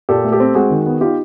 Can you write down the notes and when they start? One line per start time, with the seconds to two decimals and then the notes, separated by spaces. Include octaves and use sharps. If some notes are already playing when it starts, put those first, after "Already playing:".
0.09 A#2 G4 A4
0.25 A3
0.32 G4 A4
0.40 C4
0.55 G#3 F#4 G#4
0.70 D#3
0.86 B3
1.01 D#4 F4 G4